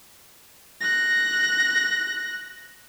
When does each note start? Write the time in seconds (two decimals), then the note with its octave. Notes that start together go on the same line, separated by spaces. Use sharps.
0.81 F#6 A#6